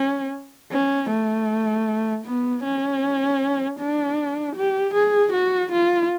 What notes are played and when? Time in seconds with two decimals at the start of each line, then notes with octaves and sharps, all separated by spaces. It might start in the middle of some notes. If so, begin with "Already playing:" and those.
Already playing: C#4
0.72 C#4
1.10 A3
2.25 B3
2.64 C#4
3.79 D4
4.56 G4
4.95 G#4
5.33 F#4
5.72 F4